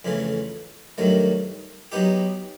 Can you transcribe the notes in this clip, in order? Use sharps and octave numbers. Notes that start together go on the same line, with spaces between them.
F2 C#3 E3 A3
G2 D#3 F#3 A3
F#3 B3 D#4 G4